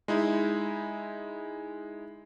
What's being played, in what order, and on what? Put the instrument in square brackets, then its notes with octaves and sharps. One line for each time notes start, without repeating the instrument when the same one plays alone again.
[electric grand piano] G#3 D#4 E4